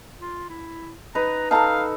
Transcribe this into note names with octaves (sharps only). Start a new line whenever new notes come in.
F4
E4
D#4 B4 A#5
D#4 A4 F5 A5 A#5